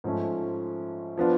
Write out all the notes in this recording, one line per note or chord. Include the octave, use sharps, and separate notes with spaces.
G#2 F3 A3 C#4
F3 B3 D4 F4